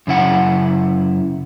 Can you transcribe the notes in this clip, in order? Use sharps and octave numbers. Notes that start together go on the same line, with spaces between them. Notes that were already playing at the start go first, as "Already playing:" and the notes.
F#2 C#3 E4 F#5